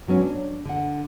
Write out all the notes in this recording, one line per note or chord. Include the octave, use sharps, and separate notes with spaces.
G#2 F#3 B3 C#4
D4
D3 F#5